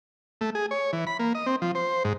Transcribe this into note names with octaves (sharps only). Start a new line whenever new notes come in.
A3
G#4
C#5
E3
B5
A#3
D#5
C4
F3
C5
G#2